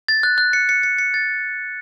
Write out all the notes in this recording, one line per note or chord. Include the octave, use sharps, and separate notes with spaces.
A6
F#6
F#6
C#7
C#7
C#7
C#7
A6